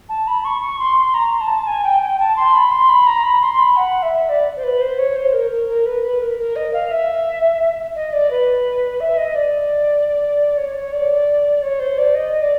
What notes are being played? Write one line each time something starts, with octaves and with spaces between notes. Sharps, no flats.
A5
B5
C#6
C#6
C6
C6
A#5
A5
G#5
G5
G5
A5
C6
B5
C6
B5
A#5
B5
C6
B5
F#5
E5
D5
C5
B4
C5
C#5
C5
A#4
A#4
A#4
B4
B4
A#4
A#4
D#5
F5
E5
D#5
D5
B4
E5
D#5
D5
C#5
C#5
D5
C#5
C5
D5
D#5
D5